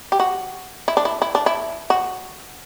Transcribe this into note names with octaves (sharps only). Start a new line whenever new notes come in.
G4
F#4
E4
D4
E4
E4
D4
E4
F#4